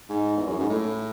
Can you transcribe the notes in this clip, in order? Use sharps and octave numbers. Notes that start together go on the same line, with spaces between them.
G#2
E2
F#2
G#2
A2